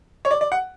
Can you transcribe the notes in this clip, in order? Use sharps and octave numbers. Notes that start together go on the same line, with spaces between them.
C#5
D5
D5
F#5